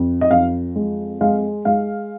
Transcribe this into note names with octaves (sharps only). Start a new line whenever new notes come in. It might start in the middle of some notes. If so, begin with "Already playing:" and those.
Already playing: F2
D#5
F2 F5
G#3
G#3 F5
G#3 F5